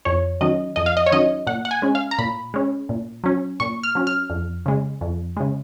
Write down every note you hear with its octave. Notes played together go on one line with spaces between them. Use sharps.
F2 C#5
D#3 F#3 C#4 D#5
F2 D#5
F5
D#5
C#5
D#3 F#3 C#4 D#5
A#2 F#5
F#5
G#5
G#3 C#4
F5
A#5
A#2 B5
G#3 C#4
A#2
F#3 C#4
A#2 C#6
F6
F#3 C#4
F6
F2
C#3 G#3
F2
C#3 G#3